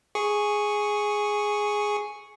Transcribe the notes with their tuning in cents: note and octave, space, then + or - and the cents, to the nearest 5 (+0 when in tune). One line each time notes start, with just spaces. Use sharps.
G#4 +0 C#6 +0